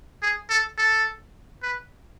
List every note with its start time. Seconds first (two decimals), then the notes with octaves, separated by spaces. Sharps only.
0.22 G#4
0.50 A4
0.78 A4
1.63 B4